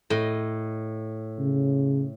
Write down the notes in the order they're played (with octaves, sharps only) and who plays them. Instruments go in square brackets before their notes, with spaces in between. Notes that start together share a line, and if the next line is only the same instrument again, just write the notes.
[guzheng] A2 D#5
[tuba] C#3